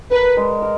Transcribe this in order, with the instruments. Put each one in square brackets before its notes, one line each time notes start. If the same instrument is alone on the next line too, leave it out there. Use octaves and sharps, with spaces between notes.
[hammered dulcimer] A#4 [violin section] B4
[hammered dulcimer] G#3
A#4